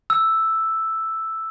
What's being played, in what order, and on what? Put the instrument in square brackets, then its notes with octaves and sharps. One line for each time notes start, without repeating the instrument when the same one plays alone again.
[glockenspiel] E6